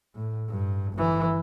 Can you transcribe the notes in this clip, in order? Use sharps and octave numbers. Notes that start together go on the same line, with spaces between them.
A2
G2
G1 E3